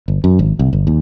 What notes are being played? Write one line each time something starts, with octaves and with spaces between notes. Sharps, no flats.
G1
F#2
G#1
C2
G1
D#2